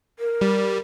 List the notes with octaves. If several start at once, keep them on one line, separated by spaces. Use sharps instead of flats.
A#4
G3